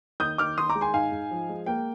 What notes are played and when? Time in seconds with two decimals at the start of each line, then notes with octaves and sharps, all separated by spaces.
0.20 D#2 D#6 G6
0.38 D#2 D6 F6
0.58 D#3 C6 D#6
0.69 A#5 D6
0.75 G#3
0.81 G#5 C6
0.94 G#2 F5 G#5
1.12 G#2
1.31 F3
1.49 G#3
1.66 A#3 G5